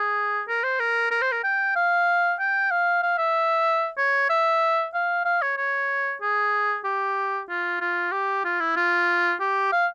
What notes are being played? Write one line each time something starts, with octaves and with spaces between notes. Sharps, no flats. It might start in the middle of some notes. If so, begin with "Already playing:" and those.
Already playing: G#4
A#4
C5
A#4
A#4
C5
A#4
G5
F5
G5
F5
F5
E5
C#5
E5
F5
F5
C#5
C#5
G#4
G4
F4
F4
G4
F4
E4
F4
G4
F5